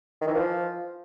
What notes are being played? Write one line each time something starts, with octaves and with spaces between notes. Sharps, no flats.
D#3
E3
F3